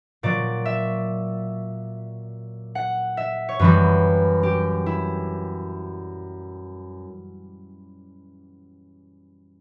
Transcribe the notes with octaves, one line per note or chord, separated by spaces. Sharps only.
A#2 F#3 D5
E5
F#5
E5
C#5
F#2 E3 G3 B4
G4
E4